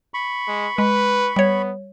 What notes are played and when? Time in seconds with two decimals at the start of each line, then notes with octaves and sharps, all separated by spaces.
0.14 B5 C#6
0.48 G#3
0.78 G#3 B4
1.36 G3 B3 C#5